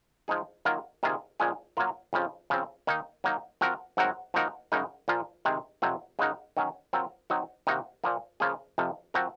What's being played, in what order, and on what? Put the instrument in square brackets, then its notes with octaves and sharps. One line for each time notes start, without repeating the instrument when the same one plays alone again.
[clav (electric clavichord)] F3 G#3 D#4 G#4
D#3 F#3 A#3 F4 A#4
C3 D#3 A#3 F4 G#4
A#2 F3 G#3 C#4 G#4
F#3 A#3 F4 A#4
F2 C#3 F3
C#3 F3 C4
D#3 A#3 D#4
F#3 A#3 D#4
F3 C4 F#4 A#4
G#2 F#3 C4 F#4 A#4
F3 A#3 D#4 F#4 A#4
F#2 C#3 G#3 D#4 A#4
A#2 F3 A#3 F4
C3 D#3 G#3 C4
F2 C3 F#3 C4
C#3 G#3 D#4 F#4 A#4
D#3 F#3 C#4
F#3 C4 F4 A#4
F#3 C4 D#4 F#4
C3 D#3 A#3 D#4 F#4
A#2 F3 A#3
C#3 F3 A#3 F4 G#4
F2 C3 F3
F3 C4 F#4 A#4